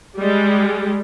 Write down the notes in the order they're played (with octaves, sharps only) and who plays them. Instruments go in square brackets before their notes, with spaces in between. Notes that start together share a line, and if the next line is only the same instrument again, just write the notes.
[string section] G3 G#3